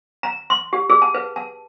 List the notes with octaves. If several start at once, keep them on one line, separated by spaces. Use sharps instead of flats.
A#5
C6
G4
G#4
A5
B4
A5